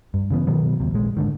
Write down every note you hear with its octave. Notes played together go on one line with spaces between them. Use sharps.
G2
C#3 E3 B3
B2 D#3 F#3 B3
D#2 C3
A#1 G#3
G#2 D3 D#3